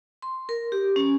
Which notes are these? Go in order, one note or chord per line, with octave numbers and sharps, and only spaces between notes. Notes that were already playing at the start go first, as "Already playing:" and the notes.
C6
A#4
G4
C#4